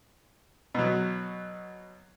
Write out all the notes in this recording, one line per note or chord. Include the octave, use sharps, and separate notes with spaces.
B2 F#3